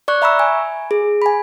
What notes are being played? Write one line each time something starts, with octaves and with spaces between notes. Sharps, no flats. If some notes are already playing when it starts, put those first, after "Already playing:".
D5 C#6 F#6
E5 A#5 B5 C#6 E6
G#5
G#4
G#5 B5